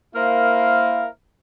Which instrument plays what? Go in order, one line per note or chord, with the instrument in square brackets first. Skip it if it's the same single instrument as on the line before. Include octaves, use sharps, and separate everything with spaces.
[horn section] A#3 E4 A#4 C5 F5